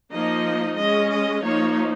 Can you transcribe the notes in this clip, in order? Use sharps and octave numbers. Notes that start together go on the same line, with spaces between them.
F3 A#3 D#4 D#5
G#3 C#4 D#5
D#5
F3 A#3 D#4 C#5